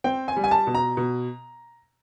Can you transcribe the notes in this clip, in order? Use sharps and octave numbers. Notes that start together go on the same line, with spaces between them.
C4 G5
G#5
G3
G#5
A5
B2
A#5
B2